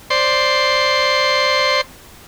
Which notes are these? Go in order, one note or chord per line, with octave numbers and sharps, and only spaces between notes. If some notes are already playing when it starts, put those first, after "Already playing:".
C5 D5 C6